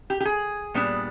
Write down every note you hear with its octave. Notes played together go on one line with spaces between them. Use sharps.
G4
G4
G#4
A#2 G3 B3 D4